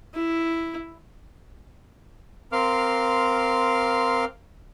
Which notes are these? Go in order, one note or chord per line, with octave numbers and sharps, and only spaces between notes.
E4
C4 A#4 F5 C6 D6 F6